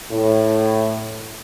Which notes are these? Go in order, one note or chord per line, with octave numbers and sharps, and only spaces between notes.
A2